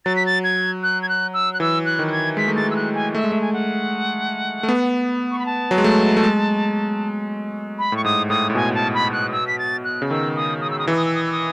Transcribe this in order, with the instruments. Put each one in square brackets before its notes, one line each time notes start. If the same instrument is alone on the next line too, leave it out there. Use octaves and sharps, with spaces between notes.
[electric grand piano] F#3 [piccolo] A6
[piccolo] B6
A6
G#6
F#6
G#6
F#6
E6
F#6
[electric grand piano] E3 [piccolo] E6
[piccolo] F#6
[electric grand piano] D#3
[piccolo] F#6
G#6
[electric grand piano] G#3 [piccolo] B6
[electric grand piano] A3
[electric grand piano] G#3 [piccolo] A6
[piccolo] E6
F#6
G#5
[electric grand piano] A3 [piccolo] E5
[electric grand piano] G#3
A3
[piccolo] G#5
F#5
[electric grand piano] A3
B3
[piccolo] C#6
B5
A5
[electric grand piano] F#3
G#3
A3
A3
G#3
[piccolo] B5
[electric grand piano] A2 [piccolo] C#6
[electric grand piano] G#2 [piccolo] D#6
[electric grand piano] A2 [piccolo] D#6
[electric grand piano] A2
[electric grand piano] B2 [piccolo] G#5
[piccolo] A5
B5
F#6
E6
B6
A6
F#6
[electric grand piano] C#3
[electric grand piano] D#3 [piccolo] E6
[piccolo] D#6
D#6
E6
D#6
[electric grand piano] E3 [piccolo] E6
[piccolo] D#6
E6
D#6
E6
D#6